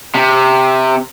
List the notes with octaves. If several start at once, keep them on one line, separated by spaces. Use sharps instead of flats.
C3